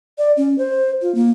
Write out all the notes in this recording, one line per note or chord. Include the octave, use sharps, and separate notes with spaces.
D5
C#4
C5
F4
A#3